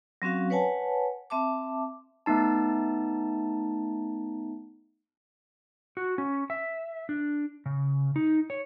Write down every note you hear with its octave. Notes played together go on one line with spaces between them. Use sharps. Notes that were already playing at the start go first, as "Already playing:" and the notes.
F#3 C4 C#4 F#4 F5
B4 C#5 F#5 G#5 A5
C4 E5 A5 D6
A3 B3 D#4 A5
F#4
C#4
E5
D4
C#3
D#4
C#5